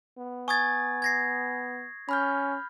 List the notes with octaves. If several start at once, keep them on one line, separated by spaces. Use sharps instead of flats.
B3
G#5 C#6 D#6 G#6 A6
G#6 A#6 C7
C#4 B5 F6 G6